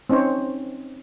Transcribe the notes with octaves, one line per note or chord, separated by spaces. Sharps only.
C4 C#4 D#4 C5 C#5